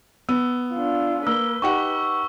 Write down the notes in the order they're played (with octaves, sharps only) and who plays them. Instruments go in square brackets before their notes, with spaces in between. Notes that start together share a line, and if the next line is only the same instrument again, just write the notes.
[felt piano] B3 [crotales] E6
[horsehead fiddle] D4 F4
[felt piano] A#3 [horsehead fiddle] B4 [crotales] E6 G7
[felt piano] D#4 G4 F#5 [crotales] C#6